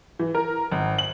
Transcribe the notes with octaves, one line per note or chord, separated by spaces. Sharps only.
E3
A#4
G#1
F#7